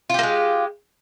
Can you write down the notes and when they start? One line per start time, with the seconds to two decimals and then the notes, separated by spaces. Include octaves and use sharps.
0.10 F4
0.14 G4
0.19 A#3
0.23 G#3